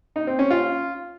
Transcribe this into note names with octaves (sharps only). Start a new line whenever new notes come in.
D#4
C4
C#4
F4